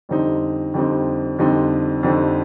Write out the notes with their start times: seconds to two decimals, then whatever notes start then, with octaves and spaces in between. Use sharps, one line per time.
0.09 F2 D3 G3 C4 D#4
0.74 F2 D3 G3 C4 D#4
1.38 F2 D3 G3 C4 D#4
2.03 F2 D3 G3 C4 D#4